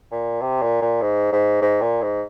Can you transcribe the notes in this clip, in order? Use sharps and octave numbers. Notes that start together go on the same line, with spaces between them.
A#2
C3
A#2
A#2
G#2
G#2
G#2
A#2
G#2